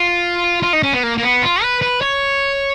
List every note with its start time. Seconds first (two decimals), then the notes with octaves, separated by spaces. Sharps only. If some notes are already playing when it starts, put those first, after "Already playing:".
Already playing: F4
0.63 F4
0.73 D#4
0.83 C#4
0.93 B3
1.03 A#3
1.18 A#3
1.23 B3
1.42 F4
1.62 B4
1.82 B4
2.01 C#5